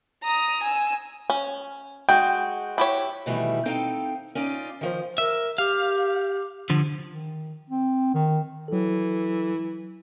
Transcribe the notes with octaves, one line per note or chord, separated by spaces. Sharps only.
A#5 D#6
G#5 E6
C#4
G#3 F#4 G5
E4 G4 C#5
B2 D#3 E3 G3 A3
C4 D#4 A4 F5 G5
C#4 D#4 F4 D5
D#3 F3 C5
A#4 E5
G4 F5
D3 F3
D#3
C4
D#3
E3 F#3 A4